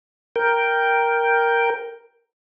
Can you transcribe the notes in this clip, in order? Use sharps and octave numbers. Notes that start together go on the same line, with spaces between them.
A#4 G5